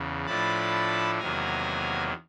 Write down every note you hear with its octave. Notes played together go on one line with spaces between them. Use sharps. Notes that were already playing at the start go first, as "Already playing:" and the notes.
Already playing: E2 C#3
A2 F3 A3 D4 A5 B5
E2 C3 D#3 F#3 A#3 G#5 A#5